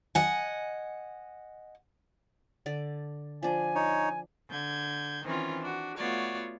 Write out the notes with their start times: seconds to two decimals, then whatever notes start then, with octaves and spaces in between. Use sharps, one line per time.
0.15 D#5 F#5 G#5
2.66 D3 D5
3.43 F3 D4 G#5
3.75 D#4 C#5
4.49 D3 G6 G#6
5.25 D#3 E3 C4 C#4 F4
5.60 D4 F#4
5.98 A3 B3 F4 F#4 C#5 D5